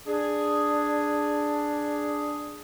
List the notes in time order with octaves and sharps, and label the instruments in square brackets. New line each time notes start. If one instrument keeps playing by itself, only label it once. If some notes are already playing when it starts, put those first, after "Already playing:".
[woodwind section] D4 G#4